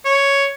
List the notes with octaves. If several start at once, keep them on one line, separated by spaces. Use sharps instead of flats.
C#5